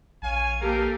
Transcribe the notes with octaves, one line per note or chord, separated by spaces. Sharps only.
A#1 C#5 F5 G#5
A#3 C4 G4 A4 A#4 F5